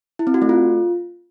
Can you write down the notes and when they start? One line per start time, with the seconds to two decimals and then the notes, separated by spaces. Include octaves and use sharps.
0.19 E4
0.27 C4
0.34 F#4
0.42 A3
0.49 F4